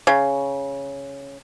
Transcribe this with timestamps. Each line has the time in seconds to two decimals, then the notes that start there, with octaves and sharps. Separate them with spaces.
0.07 C#3